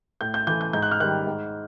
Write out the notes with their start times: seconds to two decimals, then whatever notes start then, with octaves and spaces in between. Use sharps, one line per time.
0.21 A2 G6
0.34 G6
0.47 E3 G6
0.50 A3
0.61 G6
0.73 G#2 G6
0.82 F#6
0.91 F6
1.00 D#3 G3 F#6
1.27 G#2